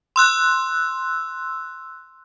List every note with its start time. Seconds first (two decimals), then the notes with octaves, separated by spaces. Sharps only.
0.16 C6 E6 F#6